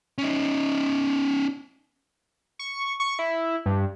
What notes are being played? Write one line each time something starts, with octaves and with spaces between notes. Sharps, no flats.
C#4 D#4
C#6
C#6
E4
G2